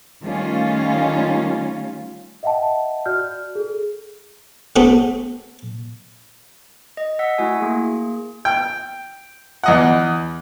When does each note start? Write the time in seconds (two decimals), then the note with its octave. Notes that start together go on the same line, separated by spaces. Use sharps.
0.23 D#3 G3 A3 C#4 F4
2.43 D#5 E5 F#5 G5 A5
3.06 F#4 D5 F6 G6
3.55 G#4 A4
4.76 A3 B3 C4 F#4 G#4 A4
6.97 D#5
7.19 F#5 E6 B6
7.38 A3 E4 F#4 G#5
7.60 A#3 G#4
8.45 G5
9.63 E2 D#5 F#5